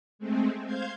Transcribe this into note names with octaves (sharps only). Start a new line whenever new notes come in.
G#3 A3 C4
C5 F5 G6 G#6